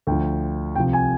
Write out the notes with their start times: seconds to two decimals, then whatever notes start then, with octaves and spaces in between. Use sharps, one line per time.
0.07 D2 D3 F3 G5
0.75 C2 C3 F3 G5
0.93 G#5